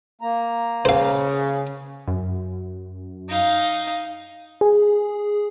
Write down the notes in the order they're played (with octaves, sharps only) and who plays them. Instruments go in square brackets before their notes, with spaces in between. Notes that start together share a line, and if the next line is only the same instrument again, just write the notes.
[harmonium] A#3 A#5
[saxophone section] C#3 [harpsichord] C5 F5
[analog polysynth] F#2
[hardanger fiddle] D#4 F5
[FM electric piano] G#4